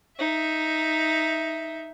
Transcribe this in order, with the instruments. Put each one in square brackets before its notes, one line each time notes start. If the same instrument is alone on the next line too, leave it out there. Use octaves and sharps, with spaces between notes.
[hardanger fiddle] D#4 E5